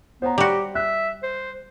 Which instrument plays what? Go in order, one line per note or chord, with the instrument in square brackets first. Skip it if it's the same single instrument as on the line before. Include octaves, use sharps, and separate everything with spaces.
[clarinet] B3 [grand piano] C5 C#5 A#5
[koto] G3 F#4 [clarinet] G4
[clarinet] E5 [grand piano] F#6
[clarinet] C5